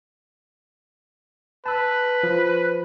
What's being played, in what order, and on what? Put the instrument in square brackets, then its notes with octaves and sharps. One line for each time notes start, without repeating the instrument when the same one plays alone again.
[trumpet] B4 [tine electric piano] A5 E6
[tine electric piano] F3